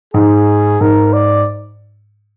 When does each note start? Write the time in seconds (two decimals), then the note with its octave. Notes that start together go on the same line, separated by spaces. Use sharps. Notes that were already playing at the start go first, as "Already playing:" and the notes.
0.14 G#2 G#4
0.81 G#2 A#4
1.13 D5